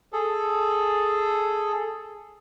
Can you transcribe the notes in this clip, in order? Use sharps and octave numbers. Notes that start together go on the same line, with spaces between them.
G#4 A4